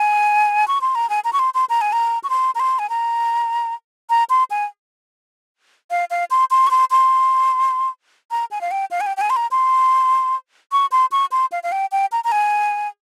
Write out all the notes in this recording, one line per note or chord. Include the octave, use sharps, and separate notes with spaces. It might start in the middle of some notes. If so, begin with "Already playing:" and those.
Already playing: G#5
C#6
C6
A#5
G#5
A#5
C#6
C6
C6
A#5
G#5
A#5
C#6
C6
A#5
C6
G#5
A#5
A#5
C6
G#5
F5
F5
C6
C6
C#6
C6
C6
A#5
G#5
F5
G5
F5
G#5
G5
G5
G#5
C6
A#5
C6
C#6
C6
C#6
C6
F5
F5
G5
G5
A#5
A#5
G#5